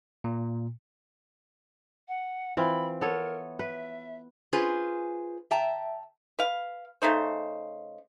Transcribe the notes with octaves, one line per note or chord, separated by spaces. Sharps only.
A#2
F#5
E3 C4 F4 B5
B3 A4 A#4 C#5
B4 E5
C#4 F4 G#4 B4 C5
E5 G5 A5 A#5
B4 F5
C#3 A3 D#4 C5